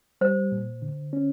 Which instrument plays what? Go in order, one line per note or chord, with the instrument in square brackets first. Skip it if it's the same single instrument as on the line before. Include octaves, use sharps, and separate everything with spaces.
[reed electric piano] G3 [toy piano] C5
[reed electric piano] A#2
D3
C#4